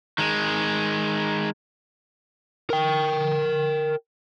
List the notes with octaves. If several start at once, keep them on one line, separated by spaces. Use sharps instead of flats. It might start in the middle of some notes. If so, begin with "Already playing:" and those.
D#3 G#3
A#4 G5